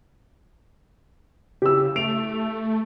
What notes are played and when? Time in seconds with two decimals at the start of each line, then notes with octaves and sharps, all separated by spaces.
1.62 C#3 G4 E6
1.96 A3 D7 F7